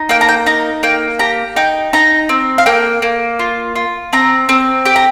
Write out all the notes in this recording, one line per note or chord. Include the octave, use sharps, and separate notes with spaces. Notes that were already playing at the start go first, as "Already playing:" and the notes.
Already playing: D#4
A#3 G5
A#5
G5
D#4 A#5
A#3 G5
G4 A#5
D#4 G5
D#4 A#5
C4
F5
A#3 G5
A#3
F4
F4
C4 A#5
C4
G4 G5
A#5